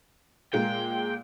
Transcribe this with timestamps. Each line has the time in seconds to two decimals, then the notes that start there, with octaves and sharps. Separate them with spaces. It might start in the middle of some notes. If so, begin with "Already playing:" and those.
0.53 A#2 G#3 A#3 G5